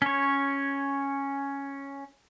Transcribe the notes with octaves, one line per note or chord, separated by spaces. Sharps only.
C#4 C#5